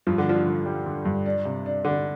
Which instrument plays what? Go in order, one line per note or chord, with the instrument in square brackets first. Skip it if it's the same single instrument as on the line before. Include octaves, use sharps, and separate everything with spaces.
[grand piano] G2 [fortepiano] F3
[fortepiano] D3
[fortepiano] F3 [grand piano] D4
[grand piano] D3
G3
D3
G2
D4
C3
D4
[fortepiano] D3 [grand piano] D4